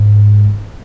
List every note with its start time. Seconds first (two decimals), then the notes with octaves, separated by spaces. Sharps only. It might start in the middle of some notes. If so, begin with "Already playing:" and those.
Already playing: G#2